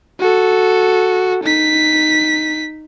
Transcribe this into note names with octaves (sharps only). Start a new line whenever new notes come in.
F#4 A4
D#4 B6